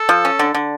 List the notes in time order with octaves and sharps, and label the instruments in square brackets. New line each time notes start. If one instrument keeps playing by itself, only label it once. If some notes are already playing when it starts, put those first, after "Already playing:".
Already playing: [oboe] A4
[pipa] F3
C#4
D3
D3